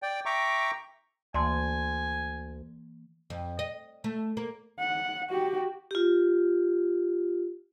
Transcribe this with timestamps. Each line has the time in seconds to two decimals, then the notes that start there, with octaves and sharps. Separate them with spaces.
0.03 D5 G5
0.26 E5 G5 A#5 C#6 D6
1.34 D2 E3 A#3 D5 G#5 A5 C6
3.30 F2
3.59 D#5
4.04 A3
4.37 A#3
4.79 F#5
5.30 F#4 G4
5.91 F4 G4